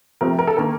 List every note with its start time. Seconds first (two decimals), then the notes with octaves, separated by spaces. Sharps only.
0.21 C3 F3 A3 C4 A#4
0.39 A#4
0.47 A4
0.57 D#3 A#3 A#4